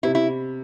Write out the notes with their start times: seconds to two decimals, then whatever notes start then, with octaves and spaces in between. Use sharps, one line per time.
0.03 C3 E4
0.15 E4